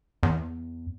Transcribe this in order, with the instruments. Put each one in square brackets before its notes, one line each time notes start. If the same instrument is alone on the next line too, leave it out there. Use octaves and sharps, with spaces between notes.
[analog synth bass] E2